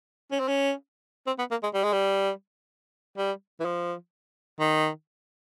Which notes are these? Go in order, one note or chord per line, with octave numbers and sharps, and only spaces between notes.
C#4
C4
C#4
C4
B3
A#3
G#3
G3
G#3
G3
G3
E3
F3
D#3